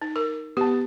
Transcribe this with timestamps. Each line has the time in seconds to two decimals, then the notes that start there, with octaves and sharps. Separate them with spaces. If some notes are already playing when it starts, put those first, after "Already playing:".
0.02 D#4
0.16 A#4
0.57 B3 G4 A5